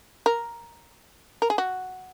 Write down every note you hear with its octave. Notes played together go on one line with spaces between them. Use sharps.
A#4
A#4
G#4
F#4